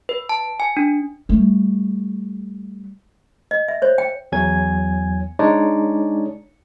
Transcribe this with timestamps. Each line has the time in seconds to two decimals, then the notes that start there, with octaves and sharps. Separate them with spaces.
0.09 B4
0.29 A5
0.60 G#5
0.77 D4
1.29 G3 A3
3.51 D#5
3.68 E5
3.82 C5 C#5
3.98 G5
4.32 E2 F#3 G#5 G#6
5.39 G#3 D4 D#4 C#5 D5